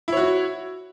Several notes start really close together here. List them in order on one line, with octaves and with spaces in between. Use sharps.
E4 C#5 F#4